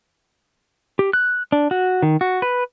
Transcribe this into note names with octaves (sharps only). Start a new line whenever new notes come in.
G4
F#6
D4
F#4
D#3
F#4
B4